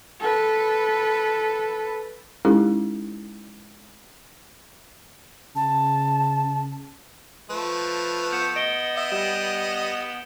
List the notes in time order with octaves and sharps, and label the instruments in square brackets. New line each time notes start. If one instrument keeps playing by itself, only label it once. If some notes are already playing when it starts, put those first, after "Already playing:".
[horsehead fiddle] A4 B4
[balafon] G#3 C#4 D#4 E4 G4 A4
[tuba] C#3 [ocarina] A5
[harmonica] F3 A3 [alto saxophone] B4
[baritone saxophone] B3 [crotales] G6 C#7 E7
[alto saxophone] D#5 [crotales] D7 G7
[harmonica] D#5 [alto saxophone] E5
[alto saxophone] G3 [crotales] E7